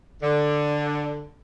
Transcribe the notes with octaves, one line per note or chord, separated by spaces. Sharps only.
D3